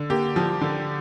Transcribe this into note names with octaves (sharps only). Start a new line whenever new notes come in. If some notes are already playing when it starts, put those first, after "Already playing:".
Already playing: D3
A#3 G4
F3
D3